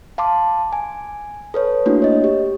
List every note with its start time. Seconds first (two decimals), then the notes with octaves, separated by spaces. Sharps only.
0.18 F5 A5 C6 D6
0.73 G#5
1.54 A4 B4 C#5
1.86 A3 A#3 D4 E4 F#4
2.02 C#5 D#5
2.24 G4